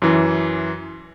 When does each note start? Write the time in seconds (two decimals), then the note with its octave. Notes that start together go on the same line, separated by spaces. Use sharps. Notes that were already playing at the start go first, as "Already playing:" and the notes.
0.02 F#2 E3